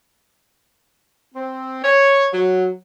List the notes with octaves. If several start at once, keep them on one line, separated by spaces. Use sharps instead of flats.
C4
C#5
F#3